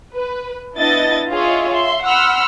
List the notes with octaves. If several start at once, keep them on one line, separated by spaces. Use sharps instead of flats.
B4
B3 D4 E4 D#5 A6
F4 G#4 C#5 D#5 E5
E5 C6
F#5 B5 C6 E6 F6